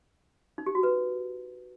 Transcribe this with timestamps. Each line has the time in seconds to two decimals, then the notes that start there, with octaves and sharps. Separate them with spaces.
0.58 D#4
0.66 G4
0.75 F#4
0.83 B4